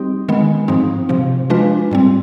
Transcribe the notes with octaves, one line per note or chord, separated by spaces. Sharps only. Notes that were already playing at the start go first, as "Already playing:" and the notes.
Already playing: G3 C4 D#4 G4
D#3 G#3 B3
G#2 F3 C4 D#4
C3 F3 C4
F3 G#3 D4 F4 B4
G#2 G3 C4